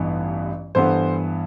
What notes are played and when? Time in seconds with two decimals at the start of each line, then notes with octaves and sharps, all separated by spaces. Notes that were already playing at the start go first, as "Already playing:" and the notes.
Already playing: A1 G2 E3 B3 D#4
0.75 G2 E3 B3 A4 C5